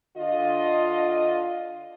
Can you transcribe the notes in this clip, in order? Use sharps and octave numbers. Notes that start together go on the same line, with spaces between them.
D3 F4 D#5